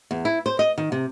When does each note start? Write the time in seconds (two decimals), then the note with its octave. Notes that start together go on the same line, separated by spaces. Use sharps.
0.11 E2
0.25 E4
0.46 C5
0.59 D#5
0.78 D#3
0.92 C3